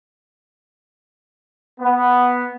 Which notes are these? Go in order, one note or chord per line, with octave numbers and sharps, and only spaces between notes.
B3